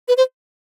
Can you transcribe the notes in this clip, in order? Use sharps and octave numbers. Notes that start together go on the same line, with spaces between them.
B4
C5